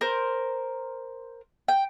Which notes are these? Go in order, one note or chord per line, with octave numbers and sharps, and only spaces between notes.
A#4 C5
G5